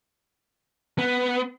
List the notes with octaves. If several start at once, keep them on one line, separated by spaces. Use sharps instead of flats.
B3